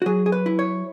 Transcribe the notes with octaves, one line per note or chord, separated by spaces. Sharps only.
F#4
F#3 G#4
G#4
B4
E4
C#5